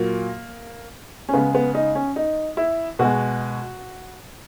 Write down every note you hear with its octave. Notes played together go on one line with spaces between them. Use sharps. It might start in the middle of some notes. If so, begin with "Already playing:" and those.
Already playing: A#2 F#3 A#3
C#4
C#3 G#3 B3
B3
D#4
C#4
D#4
E4
B2 G#3 F#4